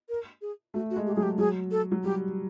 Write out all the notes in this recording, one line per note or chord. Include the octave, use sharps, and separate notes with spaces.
A#4
G#4
A3 F#4
F#4
G#3
G4
F#3 G#4
G4
F#3 G#4
A4
F#3
G3 G4